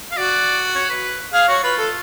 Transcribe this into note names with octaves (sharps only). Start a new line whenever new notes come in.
F5
F#4 D5
C#5
B4
G#4 F5
F#4 C#5
F4 B4
A4